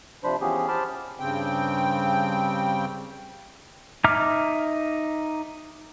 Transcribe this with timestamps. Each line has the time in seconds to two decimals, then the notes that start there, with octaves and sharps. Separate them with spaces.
0.24 C3 F3 D4 C5 B5
0.41 E3 F3 B3 C#4 G4 G#4
0.68 C5 A5 B5 C6 D6 F6
1.20 G2 C#3 C4 G5
4.04 D#4 E5 A#5 D6 F6